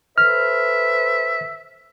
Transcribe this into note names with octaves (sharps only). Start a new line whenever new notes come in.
A4 B4 C5 E5 F6